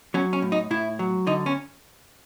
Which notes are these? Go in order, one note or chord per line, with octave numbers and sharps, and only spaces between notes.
F#3 C#4
C#4
A2
D#4
A2 E4
F#3
D3 D#4
C#4